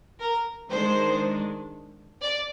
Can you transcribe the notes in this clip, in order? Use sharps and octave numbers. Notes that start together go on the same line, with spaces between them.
A#4
D#3 G#3 D4 C5
D5